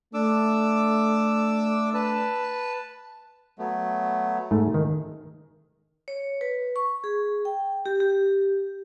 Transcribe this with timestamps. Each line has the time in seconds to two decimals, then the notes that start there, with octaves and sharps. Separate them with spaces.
0.14 A3 D4 D6 E6
1.94 B4 A5
3.59 F#3 A3 B3
4.51 G#2 A3
4.74 D#3
6.08 C#5
6.41 B4
6.76 C#6
7.04 G#4
7.45 G5
7.86 G4
8.00 G4